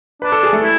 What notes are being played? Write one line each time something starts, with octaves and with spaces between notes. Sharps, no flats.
D4 B4
A4
G#4
A3 A4
E4